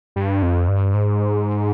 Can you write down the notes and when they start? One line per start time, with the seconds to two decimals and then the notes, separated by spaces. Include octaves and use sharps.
0.16 G2
0.42 F2
0.68 G2
0.94 G#2